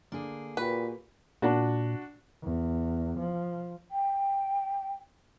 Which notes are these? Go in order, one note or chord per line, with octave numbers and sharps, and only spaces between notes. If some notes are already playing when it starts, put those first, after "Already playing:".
D3 A#3 D4 G#4
A#2 F#4 G4 B4 G5
A#2 D4 F#4
E2
F3
G5